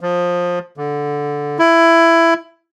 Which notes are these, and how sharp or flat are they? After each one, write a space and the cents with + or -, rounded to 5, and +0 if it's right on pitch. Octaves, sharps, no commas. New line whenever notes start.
F3 +20
D3 -10
E4 +15